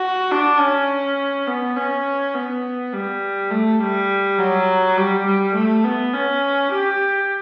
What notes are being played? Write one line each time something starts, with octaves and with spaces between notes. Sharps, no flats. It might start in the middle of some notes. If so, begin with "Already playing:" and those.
Already playing: F#4
D4
C#4
B3
C#4
B3
G3
A3
G3
F#3
G3
G3
A3
B3
C#4
G4